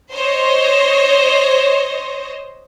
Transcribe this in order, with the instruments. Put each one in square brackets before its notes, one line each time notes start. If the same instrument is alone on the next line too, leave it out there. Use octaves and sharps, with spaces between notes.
[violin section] C5 C#5 D#5